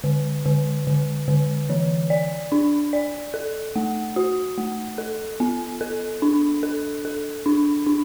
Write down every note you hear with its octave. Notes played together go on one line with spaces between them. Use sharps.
D3
D3
D3
D3
E3
D5
D4
D5
A4
A3
F#4
A3
A4
B3
A4
D4
A4
A4
D4
D4